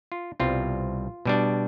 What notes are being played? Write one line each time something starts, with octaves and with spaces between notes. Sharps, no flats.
F4
C2 B2 G3 C4 F4
B2 G3 D4